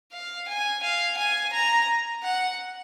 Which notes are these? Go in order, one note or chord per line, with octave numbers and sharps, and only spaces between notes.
F5
G#5
F5
G#5
A#5
F#5